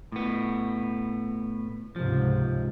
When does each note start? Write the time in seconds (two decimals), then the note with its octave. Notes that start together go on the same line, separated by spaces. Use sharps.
0.12 A2 B3
1.96 C#2 G#2 C3 F3